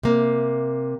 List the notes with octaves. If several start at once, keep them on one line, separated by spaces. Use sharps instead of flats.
C3 A#3